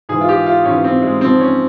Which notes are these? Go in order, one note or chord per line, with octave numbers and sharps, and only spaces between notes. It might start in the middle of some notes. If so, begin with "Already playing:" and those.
G#2 E3 G#4
F4
G4
F4
G#2 E3 C#4
C4
G#3
G#2 F3 C4
C#4